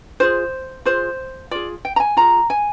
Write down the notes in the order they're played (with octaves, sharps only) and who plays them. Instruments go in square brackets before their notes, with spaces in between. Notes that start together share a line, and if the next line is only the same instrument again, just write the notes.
[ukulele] F4 G#4 C5
F4 G#4 C5
F4 G#4 D5
G5
A#5
G#5
F4 G#4 A#5
G#5